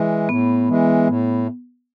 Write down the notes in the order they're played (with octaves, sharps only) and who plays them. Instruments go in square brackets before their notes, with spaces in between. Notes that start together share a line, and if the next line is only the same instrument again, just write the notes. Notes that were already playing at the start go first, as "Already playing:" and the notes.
Already playing: [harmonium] E3 G#3
[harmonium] A2 [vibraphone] B3
[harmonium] E3 G#3
A2